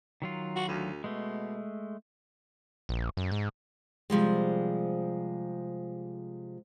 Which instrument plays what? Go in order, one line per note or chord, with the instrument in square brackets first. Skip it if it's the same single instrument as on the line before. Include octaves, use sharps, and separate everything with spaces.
[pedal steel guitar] D#3 F#3 F4
[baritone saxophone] F#4
D2
[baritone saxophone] B2 [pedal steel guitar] G#3 A3
[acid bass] A#1
F#2
G#2
[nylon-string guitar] C3 F3 G3 G#3